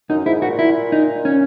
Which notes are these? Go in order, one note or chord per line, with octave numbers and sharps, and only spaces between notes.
F#2 D#4
G#2 E4
A#2 F#4
E4
D#4
C#4